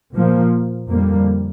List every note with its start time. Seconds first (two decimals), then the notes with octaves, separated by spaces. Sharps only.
0.13 A#2 F3 A#3
0.89 F2 D3 G3 A#3